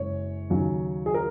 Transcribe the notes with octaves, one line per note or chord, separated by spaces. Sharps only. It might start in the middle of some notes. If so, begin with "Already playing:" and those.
Already playing: F#1 F#2 G#3 C#5
D#2 C#3 F#3 C#4
G#4
A#4